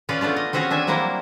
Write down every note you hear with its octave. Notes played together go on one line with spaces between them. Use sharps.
C#4 F4 G#4 B4 D5
A3 B3 D4 F4
D#5
C4 C#4 F#4 G#4 C#5
D4 E5 G#5
F#3 G3 A#3 E4 C5